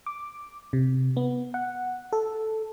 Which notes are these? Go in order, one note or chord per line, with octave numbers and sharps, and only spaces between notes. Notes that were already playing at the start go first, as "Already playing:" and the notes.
D6
C3
B3
F#5
A4